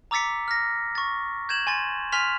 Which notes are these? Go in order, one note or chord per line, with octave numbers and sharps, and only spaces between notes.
A#5 D6 E6 A6 B6 C#7
F6 A#6
C#6 A6
G6 G#6 E7 F#7
G#5 C6 A6
G#5 C6 F6 B6 F7